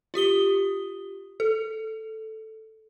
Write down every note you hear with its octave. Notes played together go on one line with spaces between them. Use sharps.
F4 G4 D#6 G7
A4